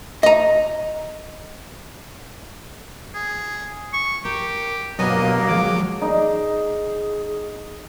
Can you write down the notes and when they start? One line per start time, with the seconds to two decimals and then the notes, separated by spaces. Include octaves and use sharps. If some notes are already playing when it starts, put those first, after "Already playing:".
0.23 D#5 A#5
3.14 G#4
3.93 C#6
4.25 G4 A#4
4.99 G2 B2 F#3 A#3 D#5 G#5
5.48 D#2 F3 G#3 D6
6.02 D#4 G#4